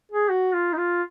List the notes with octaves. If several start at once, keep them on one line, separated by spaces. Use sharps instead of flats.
G#4
F#4
F4
D#4
F4